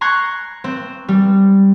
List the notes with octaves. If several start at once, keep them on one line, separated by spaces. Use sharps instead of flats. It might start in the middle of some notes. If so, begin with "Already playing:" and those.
A#5 C6 C#6 F#6 G#6
C4
G3